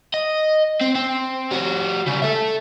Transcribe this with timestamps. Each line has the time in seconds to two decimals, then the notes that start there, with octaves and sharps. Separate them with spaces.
0.14 D#5
0.81 C4
0.96 C4
1.52 G3 F#4
2.07 C#3 G3
2.22 A4 E5